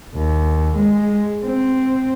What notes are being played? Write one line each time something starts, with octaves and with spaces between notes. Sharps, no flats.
D#2
G#3
C4